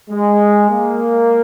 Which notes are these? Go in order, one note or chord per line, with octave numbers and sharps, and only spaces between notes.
G#3
A#3